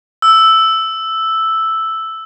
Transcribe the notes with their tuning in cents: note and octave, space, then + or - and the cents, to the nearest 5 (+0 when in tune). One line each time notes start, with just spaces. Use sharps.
E6 +0